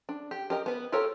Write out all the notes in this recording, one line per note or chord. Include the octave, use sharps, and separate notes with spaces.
D4
G4
G4 A#4 D#5
B3 B4
F4 G4 A4 A#4 C#5